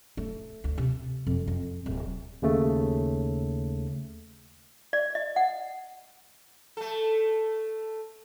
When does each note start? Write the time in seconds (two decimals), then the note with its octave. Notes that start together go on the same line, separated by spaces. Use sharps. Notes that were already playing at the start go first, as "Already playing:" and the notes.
0.17 A3
0.64 D2
0.78 C3
1.27 F2
1.47 F2
1.86 D1
2.42 D#2 C#3 A3
4.93 D5
5.15 D#5
5.36 F#5
6.77 A3 A4